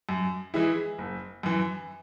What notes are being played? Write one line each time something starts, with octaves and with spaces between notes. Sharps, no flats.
F#2
E3 G#3 E4 G#4
F#1
F#2 E3